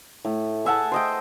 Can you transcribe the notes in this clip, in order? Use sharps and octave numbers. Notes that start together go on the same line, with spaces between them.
A2
G#4 E5 F#5 A5
C5 D#5 G5